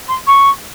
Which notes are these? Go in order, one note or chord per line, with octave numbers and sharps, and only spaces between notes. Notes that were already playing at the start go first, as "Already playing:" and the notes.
C6
C#6